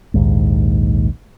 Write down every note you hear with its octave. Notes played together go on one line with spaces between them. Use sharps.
A#1 D#2 G#2